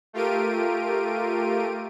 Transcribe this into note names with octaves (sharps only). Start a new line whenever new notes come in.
A3 F4 G4 A#4 D7 D#7